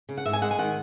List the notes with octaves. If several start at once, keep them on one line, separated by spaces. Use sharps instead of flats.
C#3
F#5
G#2 E5
G#5
G#3 F#5
G#5
D#3 F#5